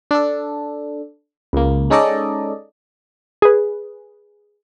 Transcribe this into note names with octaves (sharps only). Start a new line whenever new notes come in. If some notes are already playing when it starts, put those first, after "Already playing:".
D4 A4
C#2 A#3
G#3 C#4 D#4 A4 D5 D#5
G#4 B4